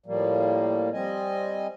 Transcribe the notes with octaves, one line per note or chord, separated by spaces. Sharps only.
A2 F3 G3 A#3
G3 C4 D#5 G#5